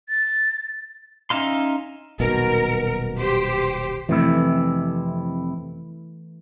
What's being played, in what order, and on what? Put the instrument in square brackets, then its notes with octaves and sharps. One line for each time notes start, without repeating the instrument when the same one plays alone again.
[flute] A6
[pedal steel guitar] C#4 D#4 E5 F5 C6
[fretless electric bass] D#1 B1 B2 [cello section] A#4
[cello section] G4 C5
[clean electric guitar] F2 C3 E4 [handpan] E3 A3